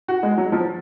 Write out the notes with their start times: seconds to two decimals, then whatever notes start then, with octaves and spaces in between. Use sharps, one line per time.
0.08 F#4
0.23 G#3
0.38 F#3
0.52 F3